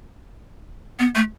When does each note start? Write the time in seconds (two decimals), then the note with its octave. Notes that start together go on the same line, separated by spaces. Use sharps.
0.99 B3
1.15 A3